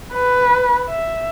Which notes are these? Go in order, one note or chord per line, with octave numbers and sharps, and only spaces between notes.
B4
E5